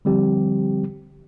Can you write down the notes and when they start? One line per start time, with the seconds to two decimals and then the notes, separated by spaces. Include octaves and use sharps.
0.05 D3 F3 G3 C4 G4